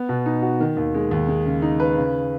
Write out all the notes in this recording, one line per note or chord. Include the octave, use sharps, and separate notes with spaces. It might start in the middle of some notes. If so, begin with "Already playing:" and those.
Already playing: B3
B2
D#4
F#4
D#3
D#2
G#3
D#2
G#3
C#3
D#4
B4
C#3